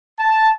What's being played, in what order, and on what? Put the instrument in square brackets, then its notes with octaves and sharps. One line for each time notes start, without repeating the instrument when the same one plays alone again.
[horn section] A5